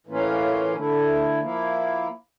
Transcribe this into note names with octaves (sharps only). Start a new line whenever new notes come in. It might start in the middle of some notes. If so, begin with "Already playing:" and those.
A2 E3 A#3 C#4 F4
D3 A3 E4
F3 A#3 E4